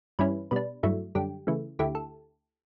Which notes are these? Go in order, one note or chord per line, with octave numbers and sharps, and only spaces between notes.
G2 E3 G3 C#4 E4 B4
B2 G3 D4 B4
G2 F#3 A3 E4
F#2 D3 G3 G4
C#3 E3 A3
D2 D3 A3 E4 G4
A4